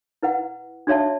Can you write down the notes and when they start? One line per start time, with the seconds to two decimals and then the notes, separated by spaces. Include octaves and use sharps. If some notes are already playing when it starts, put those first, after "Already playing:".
0.23 E4 B4 F#5
0.87 D4 F#4 C#5 E5 A5